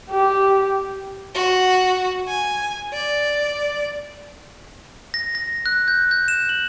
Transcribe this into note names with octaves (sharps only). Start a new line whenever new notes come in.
G4
F#4
G#5
D5
A#6
A#6
F#6
G6
G6
E7
F#7